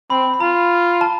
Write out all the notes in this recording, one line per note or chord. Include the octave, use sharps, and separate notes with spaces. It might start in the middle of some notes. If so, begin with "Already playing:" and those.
C4 B5
B5
F4 A#5
A5